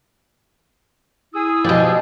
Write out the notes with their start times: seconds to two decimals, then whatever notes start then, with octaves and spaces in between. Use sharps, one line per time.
1.33 E4 G#4 D#6 E6
1.64 B2 F3 G#3 G4 D5